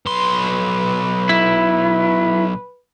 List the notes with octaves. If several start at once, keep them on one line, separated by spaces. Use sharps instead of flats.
B1 B4 C6
E4